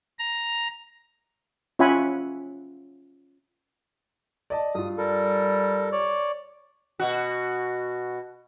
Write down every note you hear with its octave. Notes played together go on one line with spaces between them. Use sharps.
A#5
C#4 F4 E5 F#5 G#5 B5
D5 D#5 A5
G2 F4 D#6
G3 A4 A#4
C#5 D5
B2 F#4